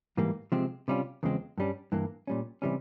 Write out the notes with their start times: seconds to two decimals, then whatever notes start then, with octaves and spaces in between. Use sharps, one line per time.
0.17 G#2 E3 G3 A#3
0.52 C3 F3 G#3 C4
0.88 C3 G3 C#4 F4
1.23 E2 C#3 F3 G#3 C4
1.58 G2 G3 C#4
1.92 G2 E3 A#3
2.27 A#2 G3 C#4
2.62 C3 E3 G3 C#4